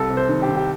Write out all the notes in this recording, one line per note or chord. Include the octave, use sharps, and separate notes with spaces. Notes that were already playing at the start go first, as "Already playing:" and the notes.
Already playing: C2 A4
C3
C5
D#3
G4
D#3
G4